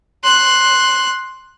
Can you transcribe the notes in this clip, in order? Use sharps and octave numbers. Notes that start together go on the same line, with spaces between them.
C6 F#6